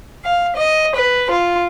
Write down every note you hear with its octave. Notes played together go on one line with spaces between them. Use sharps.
F5
D#5
B4
F4